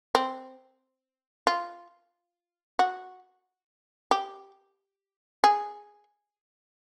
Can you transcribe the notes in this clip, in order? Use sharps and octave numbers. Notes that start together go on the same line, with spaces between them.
C4
F4
F#4
G4
G#4